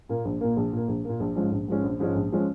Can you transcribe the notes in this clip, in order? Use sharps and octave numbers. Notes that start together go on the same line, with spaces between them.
A#2 A#3
A#1
A#2 A#3
A#1
A#2 A#3
A#1
A#2 A#3
A#1
G#2 F3 G#3 C#4
A#1
G#2 F3 G#3 C#4
A#1
G#2 F3 G#3 C#4
A#1
F3 G#3 C#4